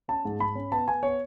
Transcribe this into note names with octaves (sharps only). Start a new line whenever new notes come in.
C#4 A5
G#2
G#2 B5
C#4
B3 A5
B3 G#5
B3 C#5